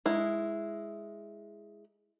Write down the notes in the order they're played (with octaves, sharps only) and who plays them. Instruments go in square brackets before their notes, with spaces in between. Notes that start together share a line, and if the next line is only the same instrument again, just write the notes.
[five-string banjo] G#3 E4